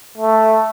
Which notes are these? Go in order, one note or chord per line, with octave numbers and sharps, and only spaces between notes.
A3